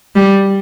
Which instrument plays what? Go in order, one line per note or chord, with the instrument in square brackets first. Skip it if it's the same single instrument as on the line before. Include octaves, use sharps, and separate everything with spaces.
[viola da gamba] G3